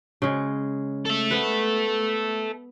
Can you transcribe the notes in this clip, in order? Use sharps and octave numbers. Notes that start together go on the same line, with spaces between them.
C#3 G#3
A4 E5
B3 B4